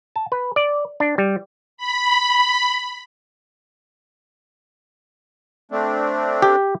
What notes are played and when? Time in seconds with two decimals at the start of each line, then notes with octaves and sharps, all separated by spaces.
0.16 A5
0.32 B4
0.56 D5
1.00 D4
1.18 G3
1.77 B5
5.71 A3 C4 D4
6.42 G4